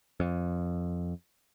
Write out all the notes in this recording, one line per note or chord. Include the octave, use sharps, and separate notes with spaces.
F2